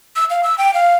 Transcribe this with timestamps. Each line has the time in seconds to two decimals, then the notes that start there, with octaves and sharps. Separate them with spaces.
0.16 E6
0.30 F5
0.43 E6
0.58 G5
0.74 F5